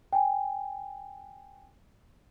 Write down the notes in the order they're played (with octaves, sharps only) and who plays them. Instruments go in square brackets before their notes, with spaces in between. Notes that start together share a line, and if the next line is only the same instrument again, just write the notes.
[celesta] G5 G#5